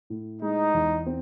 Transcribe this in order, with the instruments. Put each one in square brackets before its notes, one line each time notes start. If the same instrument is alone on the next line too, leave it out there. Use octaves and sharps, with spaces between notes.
[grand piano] A2
[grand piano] G#3 [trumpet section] D#4
[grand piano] E2
C4